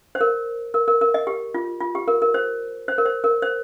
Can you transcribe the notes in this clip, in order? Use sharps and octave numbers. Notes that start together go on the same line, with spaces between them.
C5
A#4
A#4
A#4
A#4
D#5
G4
F4
F4
G4
A#4
A#4
C5
C5
A#4
C5
A#4
C5